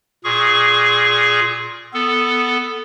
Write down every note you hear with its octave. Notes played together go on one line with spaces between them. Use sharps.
A#2 G#4 C#6
B3 A4